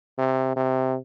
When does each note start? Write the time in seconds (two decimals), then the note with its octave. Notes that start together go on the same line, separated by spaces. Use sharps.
0.18 C3
0.56 C3